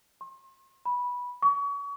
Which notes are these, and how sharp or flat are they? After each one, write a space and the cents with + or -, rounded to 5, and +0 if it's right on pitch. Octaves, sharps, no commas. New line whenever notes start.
C6 +40
B5 -10
C#6 +35